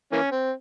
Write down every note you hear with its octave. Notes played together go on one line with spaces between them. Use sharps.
E3 A#3 C#4
C4